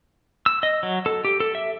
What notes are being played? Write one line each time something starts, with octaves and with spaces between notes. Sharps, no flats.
E6
D#5
F#3
A4
G4
A4
E5